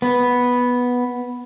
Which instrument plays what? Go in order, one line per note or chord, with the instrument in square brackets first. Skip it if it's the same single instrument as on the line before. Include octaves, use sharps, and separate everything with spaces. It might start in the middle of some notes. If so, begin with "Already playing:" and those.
[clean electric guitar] B3